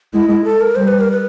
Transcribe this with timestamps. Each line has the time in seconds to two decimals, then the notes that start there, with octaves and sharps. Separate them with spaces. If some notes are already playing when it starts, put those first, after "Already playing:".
0.14 G#3 E4
0.29 E4
0.44 A4
0.61 A#4
0.76 G3 C5
0.88 B4
1.00 A#4
1.12 B4